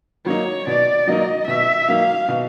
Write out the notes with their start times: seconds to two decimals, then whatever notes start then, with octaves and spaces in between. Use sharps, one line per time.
0.26 F#3 A#3 D#4 C#5
0.67 B2 D5
1.07 F#3 A#3 D#4 D#5
1.47 B2 E5
1.88 F#3 A#3 D#4 F5
2.28 B2